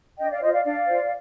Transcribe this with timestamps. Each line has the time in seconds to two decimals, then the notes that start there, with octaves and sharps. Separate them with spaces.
0.19 D4 D#5 G5
0.31 D5 F5
0.42 F4 C5 D#5
0.53 D5 F5
0.64 D4 D5 F5
0.86 F4 C5